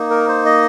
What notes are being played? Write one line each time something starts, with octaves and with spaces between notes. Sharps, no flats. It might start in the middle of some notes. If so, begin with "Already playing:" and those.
Already playing: A#3 D#4
A#4
C5
D#5